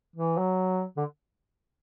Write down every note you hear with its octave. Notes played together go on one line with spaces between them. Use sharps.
E3
F#3
D3